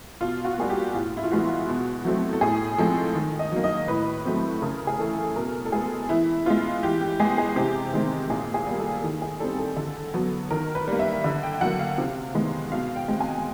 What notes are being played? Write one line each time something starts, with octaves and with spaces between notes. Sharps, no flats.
B2 F4
F#4
G3 A#3 G#4
G4
A2 F4
E4
F4
E3 G#3 B3 F#4
B2
F#3 A3 C4
A4
A2 G#4
F3 G#3 C4 A4
D#3
D#5
F#3 A#3
D#5
A2 B4
F#3 A3 C4
C#3 A#4
G#4
E3 A3 A4
B2 A#4
A4
G#3 B3 G#4
E3 E4
G#3 B3 F4
E3 G4
G4
G#3 B3 G#4
G#4
C3 G4
D#3 G#3 C4
A#2 G#4
G#4
G3 A#3
A4
D#3
G#4
G3 C4 A4
A4
D3 A4
F#3 B3
D#3 A#4
B4
G3 A#3
E5
D3
G5
F#3 A#3 F#5
F5
C3
D#3 G#3 B3
B2 F5
G5
G#3 C4
G#5